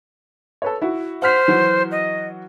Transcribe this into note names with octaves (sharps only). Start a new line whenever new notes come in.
A4 B4 C#5
E4 F#4
C5 F#5 F6 B6
E3 F#3 F#4
D#5